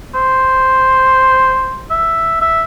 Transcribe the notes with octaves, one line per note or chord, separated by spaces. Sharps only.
C5
E5
E5